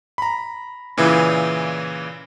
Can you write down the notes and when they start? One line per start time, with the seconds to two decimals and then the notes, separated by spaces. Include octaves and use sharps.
0.18 A#5 B5
0.97 A#2 C#3 E3 E4